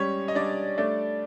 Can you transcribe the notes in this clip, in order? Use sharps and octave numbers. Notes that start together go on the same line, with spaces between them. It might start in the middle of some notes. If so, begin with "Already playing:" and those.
Already playing: G3 G#3 C#4 C#5
D#5
G3 D4 D5
A3 D4 D5